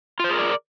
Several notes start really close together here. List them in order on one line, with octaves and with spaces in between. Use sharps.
F4 C5 G#4 A#4 D5